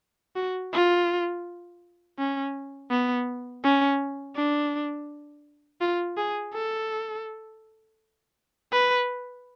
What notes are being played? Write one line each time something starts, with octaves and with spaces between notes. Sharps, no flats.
F#4
F4
C#4
B3
C#4
D4
F4
G#4
A4
B4